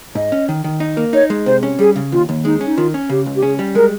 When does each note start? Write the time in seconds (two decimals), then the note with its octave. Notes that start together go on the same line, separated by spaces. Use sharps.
0.15 G#2 D#5
0.32 C#4
0.49 D#3
0.64 D#3
0.80 D#4
0.97 A#3
1.13 D#4 C#5
1.30 G#3
1.46 C3 C5
1.63 C#4
1.79 G3 G#4
1.96 C#3
2.12 D#2 F4
2.29 D#2
2.45 G#3 D#4
2.61 C#4
2.66 D#4
2.77 D#3 F4
2.94 C#4
3.09 C#3 G4
3.26 C#2
3.36 G4
3.43 C#4 G#4
3.59 G3
3.75 G#3 A#4